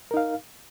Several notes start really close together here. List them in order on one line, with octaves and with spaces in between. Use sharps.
A#4 D#4 F5